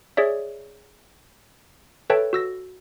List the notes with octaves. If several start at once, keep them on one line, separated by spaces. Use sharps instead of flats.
G#4 C#5 D5 E5
A4 B4 C#5 E5 G5 A5
F#4 E6 A#6